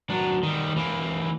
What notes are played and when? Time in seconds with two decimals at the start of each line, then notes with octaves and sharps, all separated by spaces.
0.10 F#3 D4
0.43 D#3 G3
0.76 E3 A#3